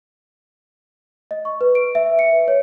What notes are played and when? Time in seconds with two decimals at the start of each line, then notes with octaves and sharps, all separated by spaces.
1.31 D#5
1.45 C#6
1.61 B4
1.75 D7
1.95 E5
2.19 C#7
2.32 B4
2.48 C#5